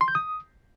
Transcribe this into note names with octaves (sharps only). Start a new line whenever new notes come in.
C6
G6
D#6